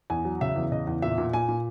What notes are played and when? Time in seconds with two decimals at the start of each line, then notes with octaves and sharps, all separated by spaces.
0.10 E2 G#5
0.25 F#3
0.41 C#3 E5
0.56 E2
0.72 C#3 D#5
0.87 E2
1.02 A#2 E5
1.18 A#2
1.33 A#2 G#5
1.49 A#2